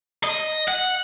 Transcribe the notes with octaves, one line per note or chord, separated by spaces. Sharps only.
D#5
F#5